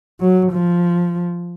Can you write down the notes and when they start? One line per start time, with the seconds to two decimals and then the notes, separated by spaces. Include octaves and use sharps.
0.20 F#3
0.53 F3